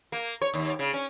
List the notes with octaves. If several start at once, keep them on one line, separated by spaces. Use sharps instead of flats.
A#3
C#5
D#2
C#3
C#4